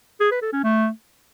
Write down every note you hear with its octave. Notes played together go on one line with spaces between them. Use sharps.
G#4
B4
A4
C#4
A3